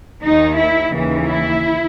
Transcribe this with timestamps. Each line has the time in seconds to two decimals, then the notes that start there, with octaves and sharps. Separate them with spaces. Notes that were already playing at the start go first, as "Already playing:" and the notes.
0.23 D#2 D#3 D#4
0.59 E4
0.93 D#2 C#3 E3
1.28 E4